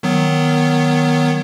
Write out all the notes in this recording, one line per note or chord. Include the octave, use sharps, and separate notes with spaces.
D#3 F#3 B3